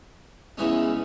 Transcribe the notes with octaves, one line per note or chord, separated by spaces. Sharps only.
E2 C#3 E3 G#3 C#4